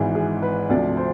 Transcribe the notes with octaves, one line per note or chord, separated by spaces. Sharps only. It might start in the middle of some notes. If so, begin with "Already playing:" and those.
Already playing: G#1 G#2 E3 G#4
G#4
B4
D2 C3 F3 D5
C5